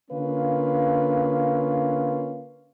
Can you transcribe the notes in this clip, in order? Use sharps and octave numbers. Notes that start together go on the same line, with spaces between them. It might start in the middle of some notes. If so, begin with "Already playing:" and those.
D3 A#3 C#4 F4 B4 F5